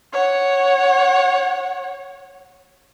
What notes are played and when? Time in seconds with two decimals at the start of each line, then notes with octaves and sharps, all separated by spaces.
0.13 C#5 F#5